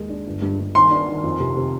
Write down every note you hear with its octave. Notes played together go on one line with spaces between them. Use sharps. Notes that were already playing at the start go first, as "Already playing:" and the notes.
Already playing: D#2 G#3
D4
G1
G2
G2
D#3 C6
D4
D#3
F2
C3
C3